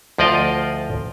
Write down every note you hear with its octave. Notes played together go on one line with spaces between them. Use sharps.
D2 F3 D5 D#5 F5 G5